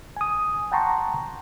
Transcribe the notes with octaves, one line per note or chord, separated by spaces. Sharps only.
G#5 D#6
F#5 G5 A5 A#5 C6 C#6